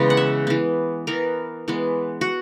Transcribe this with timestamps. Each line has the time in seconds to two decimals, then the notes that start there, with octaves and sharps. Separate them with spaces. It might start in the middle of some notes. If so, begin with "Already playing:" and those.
Already playing: C#3 E3 G#3 B3
0.10 F#5
0.17 E5
0.47 E3 B3
1.07 E3 B3 A#4
1.68 E3 G#3 B3
2.21 F#4